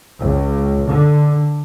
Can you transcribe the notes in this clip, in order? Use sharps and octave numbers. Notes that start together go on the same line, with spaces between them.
C#2
D3